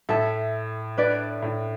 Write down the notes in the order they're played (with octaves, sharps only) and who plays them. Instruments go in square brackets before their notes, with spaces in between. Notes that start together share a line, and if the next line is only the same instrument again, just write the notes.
[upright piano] A2 [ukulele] A4 E5 A5
[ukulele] D4 B4 D5
[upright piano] A2